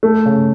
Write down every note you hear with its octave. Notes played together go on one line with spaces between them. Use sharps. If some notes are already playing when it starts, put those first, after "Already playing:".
A3
C#3